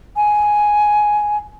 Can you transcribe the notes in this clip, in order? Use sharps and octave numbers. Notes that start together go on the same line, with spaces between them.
G#5